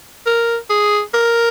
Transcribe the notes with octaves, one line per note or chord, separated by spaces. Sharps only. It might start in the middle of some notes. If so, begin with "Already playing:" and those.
A#4
G#4
A#4